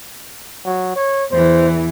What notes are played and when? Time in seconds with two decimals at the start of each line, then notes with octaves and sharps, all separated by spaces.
0.65 F#3
0.96 C#5
1.32 E2 E3 C5